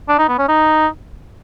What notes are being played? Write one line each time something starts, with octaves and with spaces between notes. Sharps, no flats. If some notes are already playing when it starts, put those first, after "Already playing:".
D4
D#4
B3
C#4
D#4